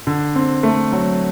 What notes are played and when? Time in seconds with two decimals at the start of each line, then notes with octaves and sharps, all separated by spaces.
0.07 D3
0.36 C4
0.63 A3
0.92 F#3